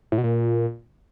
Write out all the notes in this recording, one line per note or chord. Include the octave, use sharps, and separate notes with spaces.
A2
B2
A#2